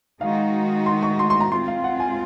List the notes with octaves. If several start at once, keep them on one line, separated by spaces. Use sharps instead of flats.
D#3 G#3 D#4 F#4 F5
C6
C#6
C6
C6
A#5
G#3 C4 F4 C6
F5
F#5
G#5